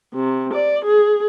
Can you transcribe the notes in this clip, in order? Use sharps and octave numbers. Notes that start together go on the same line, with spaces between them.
C3
D5
G#4